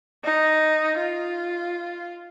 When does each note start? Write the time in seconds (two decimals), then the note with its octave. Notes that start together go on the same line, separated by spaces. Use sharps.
0.24 D#4
0.98 F4